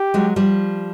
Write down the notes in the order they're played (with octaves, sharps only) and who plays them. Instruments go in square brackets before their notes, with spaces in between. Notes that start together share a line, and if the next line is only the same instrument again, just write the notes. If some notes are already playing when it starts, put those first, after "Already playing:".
Already playing: [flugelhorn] G4
[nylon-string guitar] F#3 G#3
F3 G3